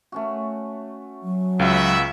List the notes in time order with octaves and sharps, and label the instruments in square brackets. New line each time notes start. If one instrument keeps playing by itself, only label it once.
[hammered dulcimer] A3 C#4 F#4
[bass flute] F#3
[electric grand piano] C#2 [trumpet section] B3 F#4 E5 [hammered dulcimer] F5